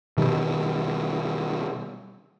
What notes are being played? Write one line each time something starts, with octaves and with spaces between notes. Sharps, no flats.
B2 D#3 G3